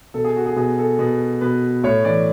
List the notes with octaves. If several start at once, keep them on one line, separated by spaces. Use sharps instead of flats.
B2 A4
G#4
F#4
G#4
B2 G#4
A4
B2
B2 B4
A2 C#5
E3 D5